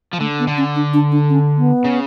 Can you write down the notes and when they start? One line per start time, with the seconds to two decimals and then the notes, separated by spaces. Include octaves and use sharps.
0.13 F3
0.20 D3 A3
0.39 B3
0.47 D3
0.57 C#4
0.76 D4
0.94 D4
1.12 D4
1.30 C#4
1.57 B3
1.85 C#3